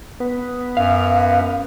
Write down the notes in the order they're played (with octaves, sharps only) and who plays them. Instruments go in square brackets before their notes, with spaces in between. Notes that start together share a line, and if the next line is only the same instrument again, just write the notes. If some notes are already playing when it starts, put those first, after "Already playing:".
[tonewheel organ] B3
[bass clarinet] F#2 [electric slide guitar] F5